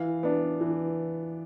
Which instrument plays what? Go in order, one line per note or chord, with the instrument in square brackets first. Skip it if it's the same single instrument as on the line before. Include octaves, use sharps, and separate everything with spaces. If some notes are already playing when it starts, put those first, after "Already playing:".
Already playing: [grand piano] E3 F5
B3 D4
E3